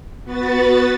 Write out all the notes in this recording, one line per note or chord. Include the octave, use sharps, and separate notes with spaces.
B3 F#4 B4 A6